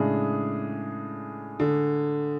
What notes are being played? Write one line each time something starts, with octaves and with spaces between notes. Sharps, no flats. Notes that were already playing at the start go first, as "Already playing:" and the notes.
Already playing: A2 C#3 G#3 D4 G#4
D3